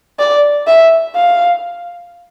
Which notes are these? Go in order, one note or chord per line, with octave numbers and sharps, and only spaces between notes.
D5
E5
F5